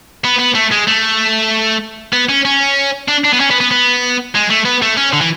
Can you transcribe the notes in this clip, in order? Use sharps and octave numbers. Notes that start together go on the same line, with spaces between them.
B3
B3
A3
G#3
A3
B3
C#4
C#4
D4
D4
B3
C#4
B3
B3
B3
G#3
A3
B3
A3
C#4
D3
E3